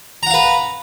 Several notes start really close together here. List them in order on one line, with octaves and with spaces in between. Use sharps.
A#5 F#5 F5 B4